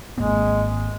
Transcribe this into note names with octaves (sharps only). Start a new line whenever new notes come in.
G#1 G#3 A#3 C4